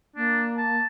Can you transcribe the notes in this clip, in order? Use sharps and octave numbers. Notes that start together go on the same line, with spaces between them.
A#3 D4
A5